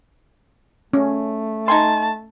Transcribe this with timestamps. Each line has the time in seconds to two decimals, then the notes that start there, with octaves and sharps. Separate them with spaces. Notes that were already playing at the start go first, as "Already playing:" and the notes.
0.93 A3 C#4
1.68 D#4 G#5 A5 C6